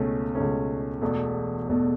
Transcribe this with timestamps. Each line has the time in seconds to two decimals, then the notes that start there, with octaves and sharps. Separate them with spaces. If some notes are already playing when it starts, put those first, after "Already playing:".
Already playing: C#2 B2 A3 C#4
0.35 C#2 B2 A3 C#4
1.02 E1 E2 B2 A3
1.69 E1 E2 B2 A3